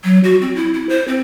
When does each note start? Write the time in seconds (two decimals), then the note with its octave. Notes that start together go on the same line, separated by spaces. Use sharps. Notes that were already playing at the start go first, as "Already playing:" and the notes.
0.04 F#3
0.24 F#4
0.41 C4
0.56 E4
0.74 E4
0.89 C5
1.08 C4